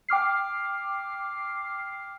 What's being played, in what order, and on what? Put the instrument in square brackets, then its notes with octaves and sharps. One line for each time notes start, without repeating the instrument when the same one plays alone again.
[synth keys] G5 D6 F6 C7